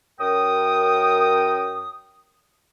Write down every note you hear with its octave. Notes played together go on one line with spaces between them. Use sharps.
F#2 A#4 G5 D#6